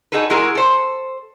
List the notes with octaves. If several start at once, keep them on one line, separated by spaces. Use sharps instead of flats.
D#4 F#4 G#4 A4 B4
E3 G#3 E4 F#4 G#4 A#4
A4 C5